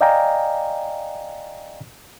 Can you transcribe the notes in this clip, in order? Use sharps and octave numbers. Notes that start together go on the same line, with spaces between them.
D5 D#5 F5 G5 G#5 A#5